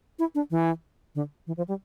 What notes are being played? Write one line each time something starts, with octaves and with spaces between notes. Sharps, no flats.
E4
D4
E3
D3
E3
F3
G3